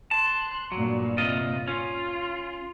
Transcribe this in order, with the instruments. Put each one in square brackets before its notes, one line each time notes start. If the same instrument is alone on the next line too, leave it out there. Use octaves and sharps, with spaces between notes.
[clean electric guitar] A5 [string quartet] C6 F#6
[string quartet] G2 A#2 [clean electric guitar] F#3
[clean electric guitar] C3 F4 D#5
[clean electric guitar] C#4 [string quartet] F4